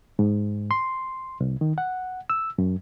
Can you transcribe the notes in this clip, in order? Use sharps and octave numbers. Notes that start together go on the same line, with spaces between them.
G#2
C6
C2
D#3
F#5
E6
F#2